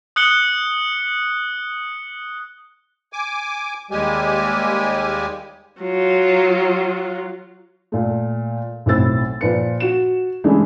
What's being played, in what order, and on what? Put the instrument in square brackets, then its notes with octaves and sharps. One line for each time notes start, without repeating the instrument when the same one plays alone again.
[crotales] D#6 F#6 C#7 G7
[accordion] G#5 D6
D#2 G3 G#3 G4 G#5
[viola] F#3 F4
[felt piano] A#2 A3
B1 A2 C4 E4 E6 A6
A#2 F3 B4 C#7
F#4 E7
G2 C#3 E3 G#3 A3